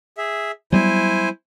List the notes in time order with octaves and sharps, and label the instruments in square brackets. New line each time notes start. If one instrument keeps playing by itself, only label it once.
[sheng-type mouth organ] G#4 E5
[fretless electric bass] F#3 G3 B3 [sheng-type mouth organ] E4 C5 G#5